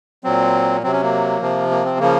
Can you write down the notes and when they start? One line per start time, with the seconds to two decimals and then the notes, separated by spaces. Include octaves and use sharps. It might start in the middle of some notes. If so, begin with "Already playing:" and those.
0.24 A#2 F#3 C4
0.83 C3 F#3 C4
0.93 C#4
1.03 A#3
1.42 C3 F3
1.71 A#3
1.85 C4
1.99 C#3 F3 A#3